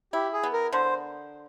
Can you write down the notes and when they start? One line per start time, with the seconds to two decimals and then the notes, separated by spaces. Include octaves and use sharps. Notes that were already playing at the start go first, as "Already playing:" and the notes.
0.13 E4 G4
0.33 G#4
0.43 B3
0.53 A#4
0.73 D3 C5